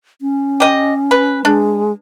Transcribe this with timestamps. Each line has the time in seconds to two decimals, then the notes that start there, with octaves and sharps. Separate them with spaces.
0.21 C#4
0.60 G4 D#5
1.11 B4
1.45 G#3 D4